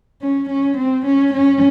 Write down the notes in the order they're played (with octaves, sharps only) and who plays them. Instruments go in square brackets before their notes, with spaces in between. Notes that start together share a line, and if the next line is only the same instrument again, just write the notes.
[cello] C#4
C#4
C4
C#4
C#4